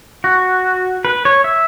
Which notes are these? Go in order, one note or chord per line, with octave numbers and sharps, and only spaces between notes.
F#4
B4
C#5
E5